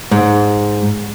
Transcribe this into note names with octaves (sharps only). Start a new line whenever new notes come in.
G#2